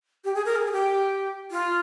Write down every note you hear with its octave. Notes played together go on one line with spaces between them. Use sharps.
G4
G#4
A#4
G#4
G#4
G4
F4